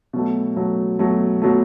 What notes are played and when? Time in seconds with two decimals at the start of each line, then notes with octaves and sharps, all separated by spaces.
0.13 B2 F#3 A3
0.57 B2 F#3 A3
0.99 B2 F#3 A3
1.42 B2 F#3 A3